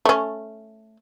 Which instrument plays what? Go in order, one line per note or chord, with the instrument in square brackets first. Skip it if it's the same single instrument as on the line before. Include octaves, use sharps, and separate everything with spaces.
[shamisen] A3 C#4